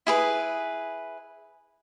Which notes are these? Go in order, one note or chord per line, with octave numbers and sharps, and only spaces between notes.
E4 G#4 B4